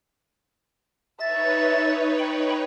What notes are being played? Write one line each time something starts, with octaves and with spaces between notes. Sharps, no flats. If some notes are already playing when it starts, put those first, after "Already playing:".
D#4 B4 C#5 E5 A6
G5 B5